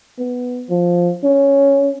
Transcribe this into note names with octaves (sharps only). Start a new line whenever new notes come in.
B3
F3
C#4